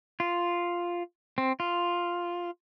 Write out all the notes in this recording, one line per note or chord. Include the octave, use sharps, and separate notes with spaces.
F4
C4
F4